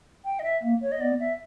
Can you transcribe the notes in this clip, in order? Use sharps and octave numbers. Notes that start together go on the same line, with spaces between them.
G5
D#5
E5
A#3
C#5
D#5
B3 D5
E5